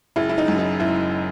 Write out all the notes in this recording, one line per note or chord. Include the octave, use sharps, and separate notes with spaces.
F#1 E4
E4
D#4
F#2
D#4
F#1 E4